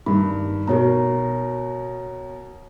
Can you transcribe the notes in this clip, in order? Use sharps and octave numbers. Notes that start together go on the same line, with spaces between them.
G2 D#3 B5
B2 F#4 A#4 C#5 A#5